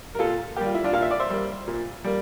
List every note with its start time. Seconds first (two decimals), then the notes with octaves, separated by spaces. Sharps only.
0.15 A#4
0.19 A#2 F4 A4
0.56 A#3 G4
0.61 G3 F4
0.75 E4
0.84 D4 F4
0.93 A#2 F5
1.02 E5
1.11 D5
1.20 C5 E5
1.30 G3 A#3
1.67 A#2
2.04 G3 A#3